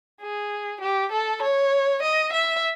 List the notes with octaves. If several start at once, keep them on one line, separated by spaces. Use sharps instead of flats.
G#4
G4
A4
C#5
D#5
E5